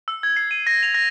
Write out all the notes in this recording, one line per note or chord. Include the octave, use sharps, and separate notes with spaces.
E6
G#6
C7
D#7
A#6
F7
A#6